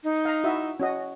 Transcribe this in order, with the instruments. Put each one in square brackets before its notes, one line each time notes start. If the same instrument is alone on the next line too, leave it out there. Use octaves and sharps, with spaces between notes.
[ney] D#4
[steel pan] F5 A#5
E4 F#4 E5
C#4 F#4 D#5